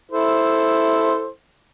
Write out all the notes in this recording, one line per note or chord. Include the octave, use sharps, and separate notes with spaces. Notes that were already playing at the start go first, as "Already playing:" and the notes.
E4 A4 C5